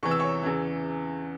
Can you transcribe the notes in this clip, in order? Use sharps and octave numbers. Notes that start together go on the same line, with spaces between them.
E2 C3 E3 C#6
E6
C#5 C#6
E2 C#3 E3